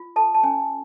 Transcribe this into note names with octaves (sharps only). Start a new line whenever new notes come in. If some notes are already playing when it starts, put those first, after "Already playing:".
Already playing: F4
A4 A5
A5
C#4 G#5